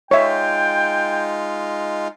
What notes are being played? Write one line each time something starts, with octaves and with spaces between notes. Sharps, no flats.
G#3 D#4 F4 C#5 E5 G5